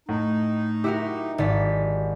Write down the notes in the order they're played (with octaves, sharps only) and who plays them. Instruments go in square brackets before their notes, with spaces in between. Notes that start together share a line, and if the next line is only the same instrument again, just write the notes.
[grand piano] A2 [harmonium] D#4
[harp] E4 F#4 A#4 [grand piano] G4
[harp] G#1 D5 B6